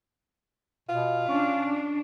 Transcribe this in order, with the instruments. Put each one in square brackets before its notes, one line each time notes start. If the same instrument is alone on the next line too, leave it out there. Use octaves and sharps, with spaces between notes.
[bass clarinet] B2 [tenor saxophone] F4
[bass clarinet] C#4 [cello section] D4